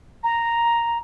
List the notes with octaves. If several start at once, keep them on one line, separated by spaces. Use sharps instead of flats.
A#5